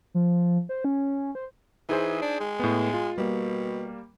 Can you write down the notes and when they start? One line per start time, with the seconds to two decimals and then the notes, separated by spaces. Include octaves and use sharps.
0.14 F3
0.69 C5
0.84 C#4
1.35 C5
1.89 E3 D#4 G#4 C5
2.22 D4
2.40 G#3
2.59 A2 B3
2.94 F4
3.18 B2 G3 A#3